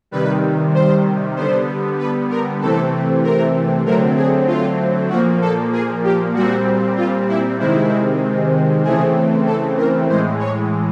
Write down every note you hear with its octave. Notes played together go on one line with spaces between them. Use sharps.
C3 D#3 G3 B4
C5
D3 G3 B3 C5
B4
A#4
C3 E3 A3 C4 A4
A#4
D3 F#3 A3 C4 A#4
G#4
F4
A#2 F3 A#3 F#4
A4
G#4
G4
A#2 G3 C4 F#4
F4
E4
C3 D#3 G#3 C4 E4
C#3 E3 A3 C4 G#4
A4
A#4
A2 E3 G#3 C5
C#5